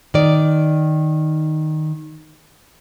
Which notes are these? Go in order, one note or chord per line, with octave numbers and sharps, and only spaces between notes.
D#3 D5